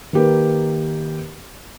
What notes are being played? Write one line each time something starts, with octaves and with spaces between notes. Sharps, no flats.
D#3 A#3 G4 A#4 B4